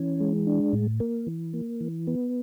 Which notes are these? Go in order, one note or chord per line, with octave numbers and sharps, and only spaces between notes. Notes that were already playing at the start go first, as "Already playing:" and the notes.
Already playing: E3 C#4
G#3
D4
A2
A#3
E3
A#3
E3
B3